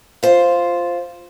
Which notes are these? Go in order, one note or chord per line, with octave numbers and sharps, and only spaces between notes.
F4 C5